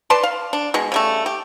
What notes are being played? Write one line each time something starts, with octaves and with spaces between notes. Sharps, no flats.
B4 D5 A5 C6
F5
D4
B2 G#3
C#3 G3 A3
G4